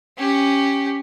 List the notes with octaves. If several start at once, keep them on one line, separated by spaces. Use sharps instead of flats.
C#4 G4